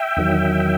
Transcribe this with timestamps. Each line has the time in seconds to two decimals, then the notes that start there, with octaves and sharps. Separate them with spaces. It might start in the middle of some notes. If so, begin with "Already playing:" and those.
Already playing: E5 G5
0.17 E2 D#3 F#3